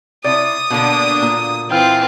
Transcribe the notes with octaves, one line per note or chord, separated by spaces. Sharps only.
C3 E4 D5 D#6
B2 D3 A#3 D4
A#2
E3 C4 F4 G5 F6